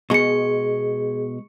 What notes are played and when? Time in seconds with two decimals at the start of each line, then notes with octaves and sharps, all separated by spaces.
0.10 B2 G#3 G#4 C#6 C#7